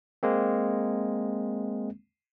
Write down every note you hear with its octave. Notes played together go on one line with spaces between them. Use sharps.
G#3 A#3 C4